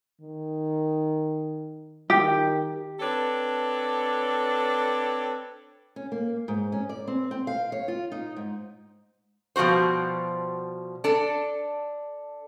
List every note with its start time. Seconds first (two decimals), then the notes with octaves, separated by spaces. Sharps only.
0.21 D#3
2.10 D#3 G4
3.00 C4 D4 A4 B4 C#5
5.96 C#4
6.12 A#3
6.48 G#2
6.72 C#4
6.89 D5
7.08 C4
7.31 C4
7.47 F5
7.72 C#5
7.88 F4
8.12 D#4
8.36 G#2
9.56 B2 F3 G3 F#4 C5
11.04 D4 A4